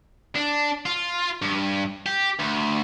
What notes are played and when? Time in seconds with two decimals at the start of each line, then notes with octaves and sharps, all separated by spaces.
0.35 D4
0.86 F4
1.42 G2
2.06 G4
2.40 D2